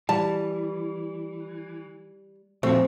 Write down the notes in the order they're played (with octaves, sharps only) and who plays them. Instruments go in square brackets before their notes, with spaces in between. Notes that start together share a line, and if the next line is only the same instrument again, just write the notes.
[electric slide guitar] E3 [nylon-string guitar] G3 [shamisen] A5
[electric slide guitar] A#2 F3 F#4 [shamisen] A3 [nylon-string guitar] C4